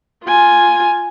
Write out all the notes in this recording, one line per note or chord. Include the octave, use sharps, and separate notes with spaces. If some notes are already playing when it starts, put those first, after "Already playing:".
F4 G#5